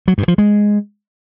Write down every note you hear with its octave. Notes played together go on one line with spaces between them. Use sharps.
F#3
G2
F3
G#3